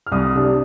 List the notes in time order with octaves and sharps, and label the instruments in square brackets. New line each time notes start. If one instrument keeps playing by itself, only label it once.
[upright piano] F6
C2 D#6
C3 G3 D4